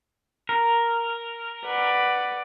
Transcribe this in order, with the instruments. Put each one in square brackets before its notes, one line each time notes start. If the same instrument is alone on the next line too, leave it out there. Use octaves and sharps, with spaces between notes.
[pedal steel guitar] A#4
[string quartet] B4 D5 F#5